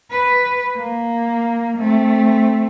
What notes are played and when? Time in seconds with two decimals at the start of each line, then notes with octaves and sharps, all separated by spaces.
0.11 B4
0.77 A#3
1.77 A3 C4